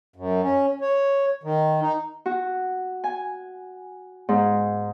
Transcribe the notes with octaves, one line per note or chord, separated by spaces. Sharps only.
F#2
C#4
C#5
D#3
D#4
F#4
G#5
G#2